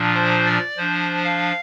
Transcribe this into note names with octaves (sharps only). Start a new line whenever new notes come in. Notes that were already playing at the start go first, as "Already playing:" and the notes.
Already playing: A#2 F3 D4
C5
D5
F3 D4 C5
F5